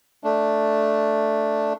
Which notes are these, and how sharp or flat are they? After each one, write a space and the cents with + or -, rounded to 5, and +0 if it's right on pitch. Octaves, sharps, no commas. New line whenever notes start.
A3 +0 D4 +0